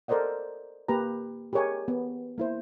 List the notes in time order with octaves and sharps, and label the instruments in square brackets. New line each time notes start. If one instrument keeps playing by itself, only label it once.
[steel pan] A4 A#4 C5 D5 D#5 F#5
A#3 G4 B4 A#5
G4 G#4 A#4 C#5 D#5 G#5
B3
A#3 E4 C5